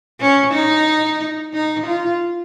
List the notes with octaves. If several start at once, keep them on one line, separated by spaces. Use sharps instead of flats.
C#4
D#4
D#4
F4